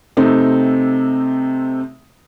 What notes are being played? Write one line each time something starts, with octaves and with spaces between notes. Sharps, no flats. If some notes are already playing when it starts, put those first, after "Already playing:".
C3 A3 C4 D#4